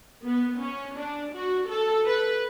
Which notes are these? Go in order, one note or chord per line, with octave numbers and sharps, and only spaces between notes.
B3
C#4
D4
F#4
A4
B4